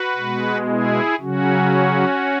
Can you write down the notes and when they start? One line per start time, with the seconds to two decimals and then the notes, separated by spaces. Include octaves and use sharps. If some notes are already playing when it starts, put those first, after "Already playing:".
Already playing: F#4 B4
0.16 B2 G#3
0.68 E4 G#4
1.20 C#3 F#3 C#4 F#4